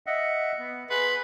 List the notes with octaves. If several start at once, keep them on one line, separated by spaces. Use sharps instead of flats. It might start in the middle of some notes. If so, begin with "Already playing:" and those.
D#5 E5 F#5
B3
G#4 B4 C6